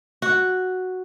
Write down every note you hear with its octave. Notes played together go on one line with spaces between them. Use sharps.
F#4